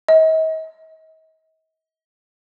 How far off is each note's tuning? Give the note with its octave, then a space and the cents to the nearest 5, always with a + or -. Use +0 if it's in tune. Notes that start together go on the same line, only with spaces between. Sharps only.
D#5 +40